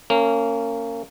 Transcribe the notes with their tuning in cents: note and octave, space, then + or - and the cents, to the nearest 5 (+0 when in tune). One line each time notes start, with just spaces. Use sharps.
A#3 -25 C#4 +0